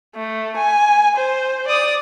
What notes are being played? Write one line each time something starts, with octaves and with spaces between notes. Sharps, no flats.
A3
G#5
C5
D5 D#6